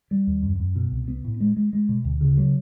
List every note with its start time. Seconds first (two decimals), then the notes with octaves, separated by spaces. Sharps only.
0.11 G3
0.27 D#2
0.43 F#2
0.60 F#2
0.76 B2
0.92 C2
1.08 B3
1.24 A2
1.40 G#3
1.57 G#3
1.73 G#3
1.89 B2
2.05 D2
2.21 C#3
2.37 F#3